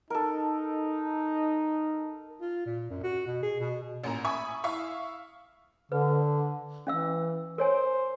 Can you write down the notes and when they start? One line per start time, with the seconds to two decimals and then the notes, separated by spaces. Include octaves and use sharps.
0.10 D#4 A4 A#4
2.41 F4
2.66 A#2
2.90 F#2
3.03 F#4
3.27 B2
3.43 G#4
3.60 B2
4.04 A1 A#2 A#3 A#5
4.24 E5 G#5 B5 C#6 D#6
4.64 E4 E5 F5 C#6
5.92 D3 B4
6.87 E3 C#4 F5 E6
7.58 A#4 C5 C#5 G#5